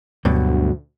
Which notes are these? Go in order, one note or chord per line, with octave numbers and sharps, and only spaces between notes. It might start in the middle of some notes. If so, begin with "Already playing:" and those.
D2 G2 B2 F#3